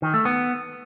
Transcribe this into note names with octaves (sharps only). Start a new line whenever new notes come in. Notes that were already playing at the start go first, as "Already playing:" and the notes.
D#3
A3
B3